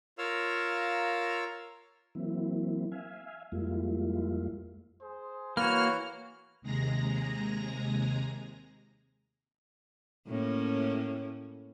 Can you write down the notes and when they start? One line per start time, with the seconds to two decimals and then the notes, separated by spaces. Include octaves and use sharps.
0.18 F4 A#4 C#5 F5 A#5 E6
2.15 E3 F#3 A#3 C4 E4
2.92 E5 F5 G#5
3.52 F2 G3 G#3 A#3 E4 F4
5.01 G#4 C5
5.57 E3 A#3 F#4 C#5 F6
6.62 D#2 C3 G#3 G#4 A#5 A#6
10.27 A2 A#3 C#4